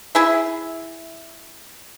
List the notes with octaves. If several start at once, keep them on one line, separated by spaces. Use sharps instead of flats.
E4 G#4 E5